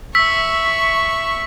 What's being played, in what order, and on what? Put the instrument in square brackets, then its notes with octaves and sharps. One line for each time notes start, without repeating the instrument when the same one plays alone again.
[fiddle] E5 C#6 [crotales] E6 B6